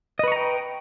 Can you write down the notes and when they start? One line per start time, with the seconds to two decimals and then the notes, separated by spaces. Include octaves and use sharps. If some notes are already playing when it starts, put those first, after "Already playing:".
0.19 D#5
0.24 B4
0.28 C#6
0.32 A#5
0.36 G5